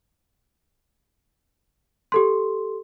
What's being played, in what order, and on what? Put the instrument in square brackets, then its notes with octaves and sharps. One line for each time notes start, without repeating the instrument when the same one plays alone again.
[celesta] G4 A4 C6